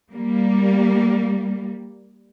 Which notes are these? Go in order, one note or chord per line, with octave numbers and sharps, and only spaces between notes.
G3 A#3